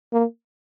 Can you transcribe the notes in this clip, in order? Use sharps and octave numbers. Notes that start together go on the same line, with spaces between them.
A#3